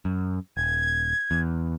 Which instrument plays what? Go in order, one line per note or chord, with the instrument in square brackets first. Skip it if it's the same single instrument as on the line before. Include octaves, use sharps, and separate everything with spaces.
[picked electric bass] F#2
[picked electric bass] D#1 [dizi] G#6
[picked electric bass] E2